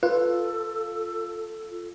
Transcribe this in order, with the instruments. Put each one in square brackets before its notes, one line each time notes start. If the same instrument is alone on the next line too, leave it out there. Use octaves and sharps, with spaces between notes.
[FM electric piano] F4 [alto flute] A4 [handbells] B4